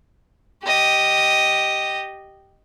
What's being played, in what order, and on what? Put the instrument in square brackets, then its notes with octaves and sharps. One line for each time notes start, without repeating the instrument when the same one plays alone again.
[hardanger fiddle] G4 D#5